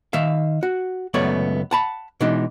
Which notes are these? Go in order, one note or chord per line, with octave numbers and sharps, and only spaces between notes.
D#3 E5 F5
F#4
C#2 F#2 A3 B3 C#5 D5
F#5 A5 B5
B2 E3 G#3 D4 D#4